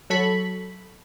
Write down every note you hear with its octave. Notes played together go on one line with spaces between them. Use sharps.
F#3 A4 B5 C#6